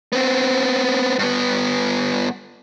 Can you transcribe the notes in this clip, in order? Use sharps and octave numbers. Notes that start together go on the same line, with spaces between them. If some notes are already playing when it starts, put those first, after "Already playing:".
B3 C4
G2 B3